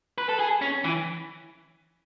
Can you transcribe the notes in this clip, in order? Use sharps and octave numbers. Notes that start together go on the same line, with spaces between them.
B4
A4
G#4
C#4
E3